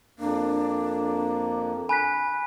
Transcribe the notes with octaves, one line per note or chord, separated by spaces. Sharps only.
F2 A#3 D4
G#5 B5 F#6 B6